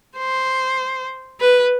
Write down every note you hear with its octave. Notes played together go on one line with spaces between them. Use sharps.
C5
B4